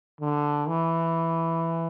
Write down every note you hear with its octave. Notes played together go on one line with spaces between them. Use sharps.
D3
E3